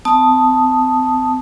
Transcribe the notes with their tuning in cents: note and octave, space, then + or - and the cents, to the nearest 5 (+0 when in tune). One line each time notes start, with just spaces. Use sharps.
C4 -40 A5 +0 D#6 +0